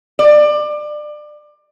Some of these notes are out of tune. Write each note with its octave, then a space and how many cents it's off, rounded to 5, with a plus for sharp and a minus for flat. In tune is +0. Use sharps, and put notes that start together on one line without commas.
D5 +25